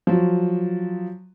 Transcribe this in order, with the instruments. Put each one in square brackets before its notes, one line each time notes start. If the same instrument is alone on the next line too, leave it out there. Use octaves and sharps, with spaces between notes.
[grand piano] F3 F#3